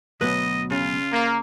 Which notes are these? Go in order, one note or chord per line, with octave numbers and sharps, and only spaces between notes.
D2 B2 F#3 B4 D#5
C#3 F4
A#3